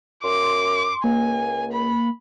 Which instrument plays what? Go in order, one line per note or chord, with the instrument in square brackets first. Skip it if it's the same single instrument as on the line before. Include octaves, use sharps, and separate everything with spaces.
[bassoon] F#2 [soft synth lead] C6 [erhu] D6
[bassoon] C#2 [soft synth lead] A#3 [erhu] G#5
[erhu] B5